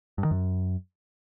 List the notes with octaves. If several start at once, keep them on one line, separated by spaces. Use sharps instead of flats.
G2
D#3
F#2